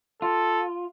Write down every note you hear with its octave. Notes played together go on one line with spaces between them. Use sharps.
F4 A4